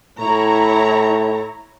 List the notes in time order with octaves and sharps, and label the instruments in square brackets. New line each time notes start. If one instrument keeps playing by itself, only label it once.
[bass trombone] A2 [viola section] E4 C#5 A#5